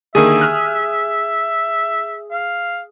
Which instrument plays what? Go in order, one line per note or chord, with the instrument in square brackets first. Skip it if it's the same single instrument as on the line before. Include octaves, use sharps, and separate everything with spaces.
[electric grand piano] D3 D#3 A#3 [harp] G#4 [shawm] E5
[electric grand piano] D#6 F6 F#6
[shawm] F5